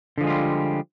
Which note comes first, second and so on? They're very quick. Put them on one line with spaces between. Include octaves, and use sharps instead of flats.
D3 F3 G#3 F4 G3